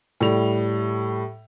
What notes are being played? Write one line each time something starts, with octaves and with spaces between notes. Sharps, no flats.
A2 G3 F7